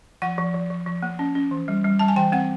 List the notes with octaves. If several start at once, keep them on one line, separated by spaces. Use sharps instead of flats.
F3 F#5
F3
F3
F3
F3
A#3
C#4
C#4
E3
G3
G3
G3 A5
G#5
E3 G5
C4 F#5